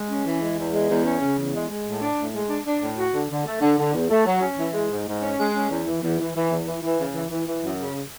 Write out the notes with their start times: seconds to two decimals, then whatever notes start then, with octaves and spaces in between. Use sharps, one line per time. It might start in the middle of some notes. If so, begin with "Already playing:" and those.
Already playing: G#3
0.09 C#4
0.25 E3
0.41 G#3
0.57 E2
0.73 G#3
0.89 E2
1.05 C#4
1.21 C#3
1.37 E2
1.54 G#3
1.69 G#3
1.85 A2
2.01 D4
2.17 A2
2.33 G#3
2.50 D4
2.66 D4
2.82 A2
2.98 F#4
3.14 D3
3.30 D3
3.46 A3
3.61 D3
3.78 D3
3.94 E2
4.10 A3
4.25 F#3
4.42 C#4
4.58 E3
4.74 G#3
4.90 G#2
5.07 G#2
5.22 C#4
5.38 G#3
5.55 C#4
5.70 E2
5.86 E3
6.03 E2
6.19 E3
6.34 E3
6.51 E2
6.67 E3
6.83 E3
6.99 C#3
7.15 E3
7.31 E3
7.47 E3
7.63 F#2
7.79 C#3